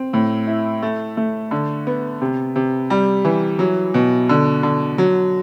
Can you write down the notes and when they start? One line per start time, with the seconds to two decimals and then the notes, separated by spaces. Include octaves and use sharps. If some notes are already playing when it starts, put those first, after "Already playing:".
Already playing: C4
0.13 A2
0.47 E4
0.82 A3
1.17 A3
1.51 D3
1.87 B3
2.21 C3
2.56 C3
2.90 G3
3.25 E3
3.59 F#3
3.94 B2
4.29 D3
4.63 D3
4.98 F#3